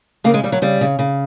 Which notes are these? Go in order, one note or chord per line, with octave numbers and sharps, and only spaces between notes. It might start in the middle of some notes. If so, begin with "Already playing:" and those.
C#3 A#3
G#3
C#3 G3
F#3
C#3 G3
C#3
C#3